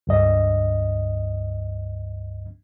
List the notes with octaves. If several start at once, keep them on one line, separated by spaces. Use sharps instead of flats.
C#2 G2 D#5